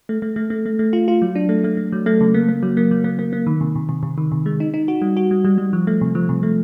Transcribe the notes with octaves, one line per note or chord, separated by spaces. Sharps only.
A3
A3
A3
A3
A3
A3
F4
F4
F#3
D4
A3
A3
A3
F#3
A3
C#3
A#3
A#3
F#3
A#3
F#3
A#3
A#3
A#3
D#3
C3
C3
C3
C3
D#3
C3
G#3
D#4
D#4
F#4
G3
F#4
G3
G3
G3
F3
A3
C3
F3
C3
A3